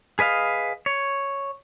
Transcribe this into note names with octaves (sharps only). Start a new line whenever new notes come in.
G#4 B4 D#5 F5
C#5